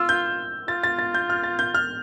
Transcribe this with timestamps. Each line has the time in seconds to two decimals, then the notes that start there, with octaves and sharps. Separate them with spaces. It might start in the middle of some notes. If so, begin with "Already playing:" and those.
Already playing: F4 E6
0.09 G6
0.68 F4 A6
0.83 A6
0.98 A6
1.14 G6
1.30 F6
1.43 A6
1.59 G6
1.74 F6